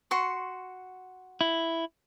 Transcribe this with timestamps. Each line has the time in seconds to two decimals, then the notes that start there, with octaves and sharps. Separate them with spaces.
0.11 F#4 C6 C#6
1.41 E4